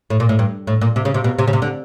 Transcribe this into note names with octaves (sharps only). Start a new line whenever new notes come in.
A2
A#2
A2
G2
A2
A#2
C3
C#3
C3
B2
C3
C#3
C3
D3